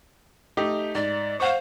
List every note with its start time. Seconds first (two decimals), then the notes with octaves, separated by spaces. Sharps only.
0.57 A3 D#4 G4
0.95 G#2 D5
1.40 C5 F5 F#5 C#6